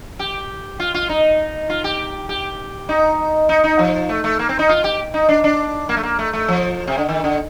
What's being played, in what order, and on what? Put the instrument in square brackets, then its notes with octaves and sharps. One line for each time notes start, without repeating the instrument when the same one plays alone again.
[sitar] G4
F4
F4
D#4
F4
G4
G4
D#4
D#4
D#4
F3
A3
A3
A#3
C4
D#4
F4
G4
D#4
D4
D4
A#3
A3
A#3
A3
A3
F3
C3
D3
D#3
D3